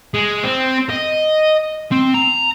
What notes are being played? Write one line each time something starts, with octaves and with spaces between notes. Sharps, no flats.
G#3
C4
D#5
C4
A#5